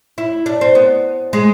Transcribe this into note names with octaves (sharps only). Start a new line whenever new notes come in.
E4
D4
C4
B3
G#3